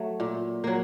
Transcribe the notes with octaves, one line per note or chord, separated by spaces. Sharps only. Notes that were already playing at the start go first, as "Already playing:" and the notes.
Already playing: F#3 A3
A#2
F#3 A#3